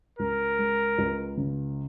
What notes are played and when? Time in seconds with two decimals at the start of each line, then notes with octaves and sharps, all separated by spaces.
0.19 C#2 A#4
0.59 G#3
0.98 C#2
1.37 C#3